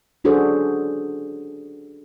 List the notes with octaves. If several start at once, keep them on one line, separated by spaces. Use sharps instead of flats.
C#4 D4 F#4 G#4 A4 C5